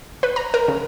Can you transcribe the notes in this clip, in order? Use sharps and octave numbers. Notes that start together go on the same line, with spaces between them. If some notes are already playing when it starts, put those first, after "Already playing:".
B4
A#5
A#4
C#3